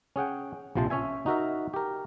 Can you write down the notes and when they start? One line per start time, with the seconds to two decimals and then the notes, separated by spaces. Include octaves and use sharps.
0.16 C#4 G#4 F#5 G5
0.75 A#1 C3 F3 C5 A5
0.90 C#4 C#5 E5 G#5
1.26 D#4 F#4 A#4 E5
1.74 G4 A#4